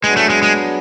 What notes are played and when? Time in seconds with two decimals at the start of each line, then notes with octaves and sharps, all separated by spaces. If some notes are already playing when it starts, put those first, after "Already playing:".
0.04 F#3 G#3 B3 D4 G#4 B4
0.17 A3
0.30 G#3
0.43 G#3